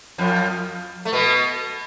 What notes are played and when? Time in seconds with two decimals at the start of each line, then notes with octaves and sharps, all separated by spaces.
0.18 F2 F3
1.05 A3
1.13 B2 B3